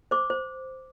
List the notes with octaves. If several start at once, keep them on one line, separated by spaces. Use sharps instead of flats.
C5 D6
C5